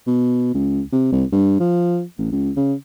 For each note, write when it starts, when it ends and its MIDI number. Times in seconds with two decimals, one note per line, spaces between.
0.07 0.50 47
0.54 0.82 37
0.92 1.10 48
1.12 1.25 36
1.32 1.60 43
1.60 2.03 53
2.18 2.30 33
2.32 2.51 37
2.57 2.74 49